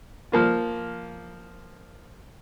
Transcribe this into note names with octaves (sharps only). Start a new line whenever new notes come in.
F3 A#3 F4